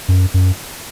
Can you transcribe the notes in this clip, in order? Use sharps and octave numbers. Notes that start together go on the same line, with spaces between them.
F#2
F#2